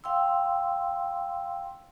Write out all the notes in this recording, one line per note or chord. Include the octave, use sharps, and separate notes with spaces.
F5 G5 C6 E6